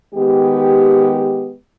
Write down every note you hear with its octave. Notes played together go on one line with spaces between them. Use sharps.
D#3 G#3 B3 G4